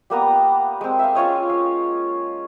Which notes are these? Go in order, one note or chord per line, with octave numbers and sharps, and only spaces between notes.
G3 A#3 B3 A#5
G#3 C4
E5 F5
C#4 F4 C#5 D#5
C#4 F5